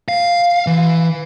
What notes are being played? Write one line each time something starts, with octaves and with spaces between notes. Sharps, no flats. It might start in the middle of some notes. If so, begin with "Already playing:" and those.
F5
E3